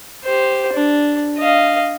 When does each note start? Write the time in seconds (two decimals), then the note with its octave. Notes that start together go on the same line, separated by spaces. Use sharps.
0.24 G4 C5
0.73 D4
1.38 D#5 F5